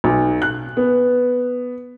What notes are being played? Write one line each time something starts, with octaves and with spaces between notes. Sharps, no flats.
B1
F#6
B3